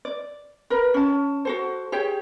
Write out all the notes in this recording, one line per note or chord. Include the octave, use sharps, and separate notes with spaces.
D5
A#4 B4
C#4 A5
F#4 A4 C5
G4 G#4 C#5 G5